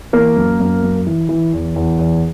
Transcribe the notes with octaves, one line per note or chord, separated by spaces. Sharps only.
E3 A#3 A#4
F#2
F#2
F#2
E3
E3
E2
E2
E2